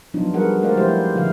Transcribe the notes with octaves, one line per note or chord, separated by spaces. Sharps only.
F3 F#3 B3 D4 D#4 F4
G3 F#4 G#4 A#4 B4 F#5
G#3 A3 A#4 C5 D5 F5
F3 G#3 E4 G4 C5
D3 F3 E4 F5